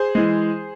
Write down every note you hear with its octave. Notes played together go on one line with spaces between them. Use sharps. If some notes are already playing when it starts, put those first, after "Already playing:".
Already playing: G#4 C5
E3 G#3